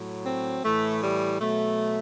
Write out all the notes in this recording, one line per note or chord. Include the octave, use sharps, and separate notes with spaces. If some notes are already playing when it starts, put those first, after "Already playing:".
Already playing: A2 F#3
C4
A2 E3 A3
G3
B2 F#3 A3